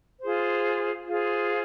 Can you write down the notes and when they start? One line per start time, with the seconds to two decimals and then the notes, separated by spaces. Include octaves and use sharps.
0.20 F4 G#4 C5
1.07 F4 G#4 C5